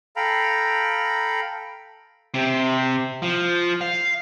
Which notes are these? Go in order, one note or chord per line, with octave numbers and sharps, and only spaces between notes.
A4 F5 G5 A#5 B5
C3
F3
F5